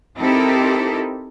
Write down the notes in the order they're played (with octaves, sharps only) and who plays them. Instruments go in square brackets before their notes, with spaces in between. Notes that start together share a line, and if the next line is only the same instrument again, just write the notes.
[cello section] C4 D#4 E4 G4 A4 A#4